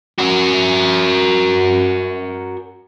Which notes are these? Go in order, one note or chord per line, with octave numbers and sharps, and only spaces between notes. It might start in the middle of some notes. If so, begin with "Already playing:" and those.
F#4 A#4